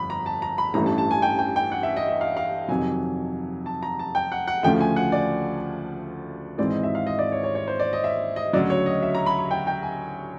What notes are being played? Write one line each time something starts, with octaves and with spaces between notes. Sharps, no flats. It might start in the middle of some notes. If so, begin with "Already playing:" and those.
Already playing: G1 F2 B5
A#5
A5
A#5
B5
A1 G2 E3 A3 C#4 A#5
A5
A5
G#5
G5
G5
G5
F#5
E5
D#5
E5
F5
F5
F2 C3 D#3 F#3 G#5
A5
A#5
A5
G5
F#5
F#5
D2 C#3 F3 A3 G5
G#5
F#5
D5
G#1 G#2 E3 G#3 C4 D5
D#5
E5
F5
D#5
D5
C#5
C#5
C#5
C5
D5
D#5
E5
D#5
D2 C#3 F#3 D5
C#5
D#5
E5
A#5
B5
B5
G5
G5
G#5